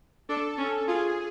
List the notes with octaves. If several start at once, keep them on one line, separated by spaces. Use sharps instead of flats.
D4 A4
C#4
F4 G#4